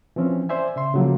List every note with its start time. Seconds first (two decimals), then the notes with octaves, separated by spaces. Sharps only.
0.16 E3 F3 C4 C#4
0.49 C5 D5 E5 G#5
0.76 C#3 E5 C6
0.94 C#3 F3 F#3 A3 A#3